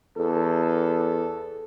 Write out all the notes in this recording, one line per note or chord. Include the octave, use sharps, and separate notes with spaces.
E2 A4